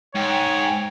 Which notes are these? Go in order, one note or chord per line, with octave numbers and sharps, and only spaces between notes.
G#2 C#5 G5